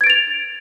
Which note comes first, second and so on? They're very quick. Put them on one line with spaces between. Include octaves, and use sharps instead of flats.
G#6 D7 A6 F7